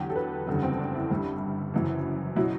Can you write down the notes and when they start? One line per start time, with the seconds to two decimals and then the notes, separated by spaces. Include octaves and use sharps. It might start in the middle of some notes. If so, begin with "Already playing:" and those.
Already playing: E2 D3 F#3 G4
0.10 A4
0.16 B4
0.47 F#1 E2 D3 G3 A4
0.63 C4
0.79 D4
0.95 E4
1.10 G1 G2 D3 G3
1.74 F#1 F#2 E3
2.36 B2 F#3 E4